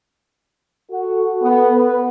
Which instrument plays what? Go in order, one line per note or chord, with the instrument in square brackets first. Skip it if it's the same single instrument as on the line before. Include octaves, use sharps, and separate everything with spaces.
[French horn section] F#4 [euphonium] A4
[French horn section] B3
B4